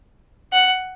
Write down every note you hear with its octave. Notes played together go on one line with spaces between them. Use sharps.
F#5